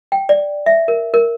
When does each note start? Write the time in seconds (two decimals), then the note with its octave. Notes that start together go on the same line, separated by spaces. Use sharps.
0.12 G5
0.29 D5
0.66 E5
0.88 A#4
1.14 A#4